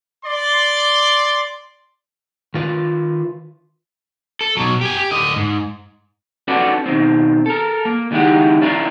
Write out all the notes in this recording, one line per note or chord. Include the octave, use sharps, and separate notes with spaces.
D5 C6
D#3 F4 B4
A4
B2 F#3
G4 G#5
G4
D3 D#5
G#2
C#4 D4 F#4 A4 B4 D5
B2 D#3 C4
A4 A#4
A#3
C#2 D#3 G#3 E4 G4 F#5
C#4 D4 E4 F4 A#4